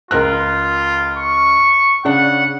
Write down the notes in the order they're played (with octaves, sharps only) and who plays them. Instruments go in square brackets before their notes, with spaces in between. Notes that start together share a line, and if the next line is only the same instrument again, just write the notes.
[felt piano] C#2 A#4 F#6 [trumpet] F4
[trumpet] C#6
[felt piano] C#3 D4 [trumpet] F#5